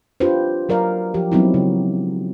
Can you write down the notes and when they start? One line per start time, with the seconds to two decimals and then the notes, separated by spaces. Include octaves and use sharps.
0.20 D4 F4 G4 B4 C5
0.69 F#3 A#4 D5 F5
1.14 F3 G4
1.32 F#3 G#3 B3 C4 D#4 E4
1.54 C#3